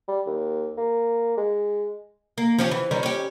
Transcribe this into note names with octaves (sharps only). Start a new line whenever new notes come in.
G3
D#2
A#3
G#3
A#3
F3 C#4 G4
E3
D#3 G3 C#4
C#4 G4